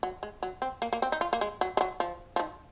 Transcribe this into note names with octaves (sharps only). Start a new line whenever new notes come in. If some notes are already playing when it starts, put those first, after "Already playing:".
F#3
G#3
F#3
C4
A#3
A#3
C4
D#4
F4
A#3
G#3
F#3
G#3
F#3
F3
F3
D#3